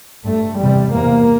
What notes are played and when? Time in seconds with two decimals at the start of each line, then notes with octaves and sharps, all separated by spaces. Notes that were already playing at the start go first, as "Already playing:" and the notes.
0.25 G2 A3
0.59 E2 C3 G3
0.93 E2 C3 A#3